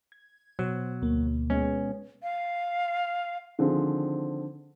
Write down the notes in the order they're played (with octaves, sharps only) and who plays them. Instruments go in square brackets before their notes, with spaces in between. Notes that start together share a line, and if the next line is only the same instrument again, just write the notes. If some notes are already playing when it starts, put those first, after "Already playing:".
[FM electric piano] G#6
[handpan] B2 [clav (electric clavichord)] F#3 [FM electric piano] C5
[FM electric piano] D2 A#3
[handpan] G#3 B3 D#5 [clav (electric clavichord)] C#4
[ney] F5
[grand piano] D3 D#3 F3 C4 G#4